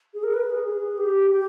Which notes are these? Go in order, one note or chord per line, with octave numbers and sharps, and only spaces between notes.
G#4
A#4
B4
G#4
G#4
G4
G4